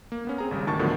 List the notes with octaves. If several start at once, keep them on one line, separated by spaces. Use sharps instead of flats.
A#3
A#3 B3 C#4
C4 G#4 A#5
G#1 C#3 G3
D2 D#3 A5 C#6 A6
A2 D3 D#3 F3 F#3 B3